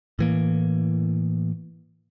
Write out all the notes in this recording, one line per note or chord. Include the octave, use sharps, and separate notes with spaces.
A2 E3 A#3